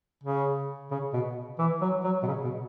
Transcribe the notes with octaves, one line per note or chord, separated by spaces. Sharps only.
C#3
C#3
B2
E3
F#3
F#3
B2
C#3
B2